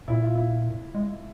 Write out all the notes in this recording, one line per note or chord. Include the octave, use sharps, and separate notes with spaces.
A#2 E4
F4
E4
G#3